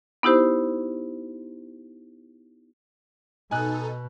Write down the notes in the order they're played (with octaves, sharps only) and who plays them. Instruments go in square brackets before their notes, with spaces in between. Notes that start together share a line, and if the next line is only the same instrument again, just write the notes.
[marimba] B3 D#4 E4 G4 C5
[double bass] B2 [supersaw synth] D#4 A4 [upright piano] G#5 F#6